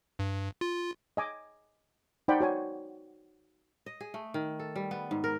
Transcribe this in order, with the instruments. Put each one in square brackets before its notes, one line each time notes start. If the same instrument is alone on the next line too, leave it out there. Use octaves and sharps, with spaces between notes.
[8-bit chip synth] G2
F4
[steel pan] D#5 G#5 D6
D#4 C5 D5 F#5 G5 B5
F#4 C#5 G#5
[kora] D#5
G#4
A3
D#3
A4
G3
B3
G#2
A#4